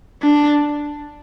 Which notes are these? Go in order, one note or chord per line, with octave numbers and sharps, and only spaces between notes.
D4